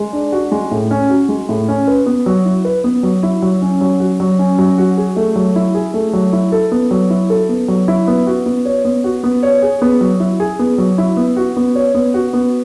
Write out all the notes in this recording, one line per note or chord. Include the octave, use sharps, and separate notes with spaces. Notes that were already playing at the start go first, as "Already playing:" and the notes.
Already playing: G#3
D4
F#4
G#3
A2
C#4
F#4
G#3
A2
C#4
B4
B3
F#3
E4
B4
B3
F#3
E4
F#3
C#4
F#3
F#4
F#3
C#4
F#3
F#4
G#4
A3
F#3
E4
G#4
A3
F#3
E4
A4
B3
F#3
E4
A4
B3
F#3
E4
B3
F#4
B3
C#5
B3
F#4
B3
C#5
G#4
B3
F#3
E4
G#4
B3
F#3
E4
B3
F#4
B3
C#5
B3
F#4
B3